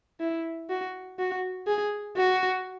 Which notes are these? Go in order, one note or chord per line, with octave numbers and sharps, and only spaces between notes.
E4
F#4
F#4
G#4
F#4